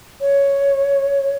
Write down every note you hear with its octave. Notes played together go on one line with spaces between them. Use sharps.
C#5